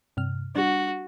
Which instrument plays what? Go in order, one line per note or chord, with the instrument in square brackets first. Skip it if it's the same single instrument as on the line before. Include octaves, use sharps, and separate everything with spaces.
[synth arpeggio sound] G2 C3 F6
[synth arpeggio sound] G3 D4 [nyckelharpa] F#4